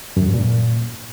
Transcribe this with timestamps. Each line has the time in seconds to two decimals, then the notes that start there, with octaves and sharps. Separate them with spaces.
0.17 F#2
0.22 E2
0.28 G2
0.34 A#2